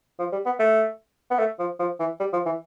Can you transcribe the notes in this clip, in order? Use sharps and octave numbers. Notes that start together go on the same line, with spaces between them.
F3
G3
B3
A3
B3
A3
F3
F3
E3
G3
F3
E3